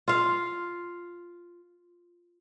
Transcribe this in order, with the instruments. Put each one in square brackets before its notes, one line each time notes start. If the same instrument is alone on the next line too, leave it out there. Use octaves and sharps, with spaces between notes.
[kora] F4 F5